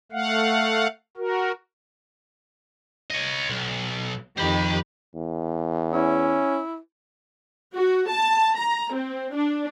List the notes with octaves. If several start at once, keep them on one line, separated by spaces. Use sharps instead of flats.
A3 F5 F#5
F#4 A#4
C#5 D#5
B1
F2 D#3 G4 C5 B5
E2
C#4 E4
F#4
A5
A#5
C4
D4